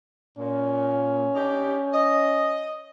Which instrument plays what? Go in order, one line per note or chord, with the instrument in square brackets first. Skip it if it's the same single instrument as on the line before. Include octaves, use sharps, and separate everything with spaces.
[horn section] A#2 [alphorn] C#4
[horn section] D4 D#4 G4
D#5